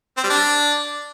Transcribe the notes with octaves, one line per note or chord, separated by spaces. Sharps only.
C4
G3
D4